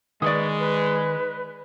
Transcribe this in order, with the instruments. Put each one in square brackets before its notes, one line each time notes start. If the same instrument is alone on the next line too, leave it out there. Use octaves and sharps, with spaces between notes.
[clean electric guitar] D#3 [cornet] G#3 [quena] B4 [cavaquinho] D5 C#6 D#6
[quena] B4